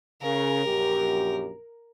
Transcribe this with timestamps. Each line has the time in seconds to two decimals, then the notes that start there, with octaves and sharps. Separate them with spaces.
0.22 C#3 A#4
0.65 A#1 F#2 G4